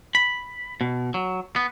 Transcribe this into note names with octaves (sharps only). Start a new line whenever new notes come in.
B5
B2
F#3
B3